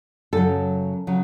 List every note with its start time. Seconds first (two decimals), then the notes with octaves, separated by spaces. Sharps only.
0.33 F#2 C#3 F#3 A4
1.07 C#3 F#3